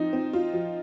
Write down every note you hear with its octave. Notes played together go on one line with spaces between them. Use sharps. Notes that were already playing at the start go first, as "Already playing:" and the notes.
Already playing: F3 C4 D#4
C4
F4
F3